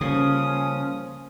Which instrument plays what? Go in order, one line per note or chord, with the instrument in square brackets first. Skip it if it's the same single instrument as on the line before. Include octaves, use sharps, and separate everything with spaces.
[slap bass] C#3 [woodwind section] F3 C#4 [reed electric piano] G3 A#3 [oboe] D#6